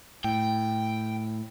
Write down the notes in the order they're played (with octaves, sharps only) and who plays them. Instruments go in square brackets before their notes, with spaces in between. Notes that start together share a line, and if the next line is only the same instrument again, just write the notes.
[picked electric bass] A2 [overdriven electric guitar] G5